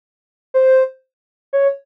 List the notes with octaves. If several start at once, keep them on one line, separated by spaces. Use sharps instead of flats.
C5
C#5